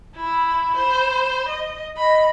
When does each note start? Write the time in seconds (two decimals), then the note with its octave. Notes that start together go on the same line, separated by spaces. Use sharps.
0.16 E4 B5
0.77 C5
1.48 D#5
1.97 D#5 B5